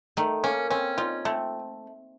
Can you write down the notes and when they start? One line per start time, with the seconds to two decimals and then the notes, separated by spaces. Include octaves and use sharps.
0.17 D#3 A3
0.44 A#3 C#4
0.70 C4 C#4
0.98 D#4 F4
1.25 A3 C4